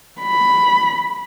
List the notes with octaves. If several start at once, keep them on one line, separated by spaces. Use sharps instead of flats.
B5